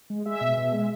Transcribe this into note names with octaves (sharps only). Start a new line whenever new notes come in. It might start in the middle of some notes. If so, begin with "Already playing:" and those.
G#3
G#3 E5
B2
B2
G#3
E5